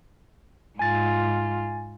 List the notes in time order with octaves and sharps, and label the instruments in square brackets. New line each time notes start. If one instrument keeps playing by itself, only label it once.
[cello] G#2 F4 [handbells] G#5 A6